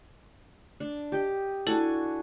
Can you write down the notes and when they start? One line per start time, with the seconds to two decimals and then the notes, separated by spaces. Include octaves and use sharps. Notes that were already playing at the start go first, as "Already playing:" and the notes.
0.80 D4
1.12 G4 D#5
1.67 D4 E4 F#4 A4 G#5 A5